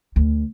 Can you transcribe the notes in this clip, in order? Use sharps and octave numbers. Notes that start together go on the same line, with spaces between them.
D2